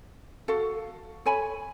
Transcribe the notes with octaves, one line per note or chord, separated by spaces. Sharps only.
F#4 A4 F5
A4 C#5 G#5 B5